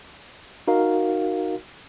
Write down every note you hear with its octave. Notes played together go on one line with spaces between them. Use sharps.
D#4 F#4 A#4 F5